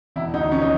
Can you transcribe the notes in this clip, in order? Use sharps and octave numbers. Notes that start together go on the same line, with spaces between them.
E1 E4
D2 D#4
F3 C#4
D#4